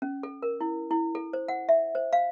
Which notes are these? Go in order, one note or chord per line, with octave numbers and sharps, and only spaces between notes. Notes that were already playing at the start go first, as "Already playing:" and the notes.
C#4
A4
A#4
E4
E4
A4
C5
F#5
E5
C5
F5